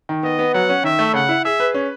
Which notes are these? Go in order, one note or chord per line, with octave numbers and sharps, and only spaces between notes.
D#3
B3 D#5
B3
F#3 F#5
C#4
D#3 E5
A3
C#3 F#5
E4
G#4 E5
B4
C#4